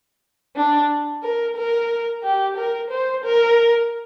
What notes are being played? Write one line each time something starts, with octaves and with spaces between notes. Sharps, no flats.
D4
A#4
A#4
G4
A#4
C5
A#4